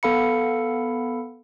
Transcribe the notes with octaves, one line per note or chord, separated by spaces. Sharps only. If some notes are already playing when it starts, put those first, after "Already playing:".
B3 A4 F5 B5 C#7